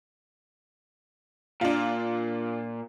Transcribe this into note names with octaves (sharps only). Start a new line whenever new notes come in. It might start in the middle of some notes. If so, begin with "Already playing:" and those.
A#2 D4 F4